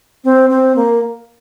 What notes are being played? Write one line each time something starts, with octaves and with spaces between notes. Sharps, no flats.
C4
C4
A#3